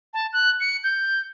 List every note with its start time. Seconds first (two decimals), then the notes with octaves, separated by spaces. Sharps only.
0.14 A5
0.33 F#6
0.61 C#7
0.84 G6